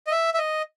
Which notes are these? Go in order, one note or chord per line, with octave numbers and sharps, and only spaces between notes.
D#5
E5
E5
D#5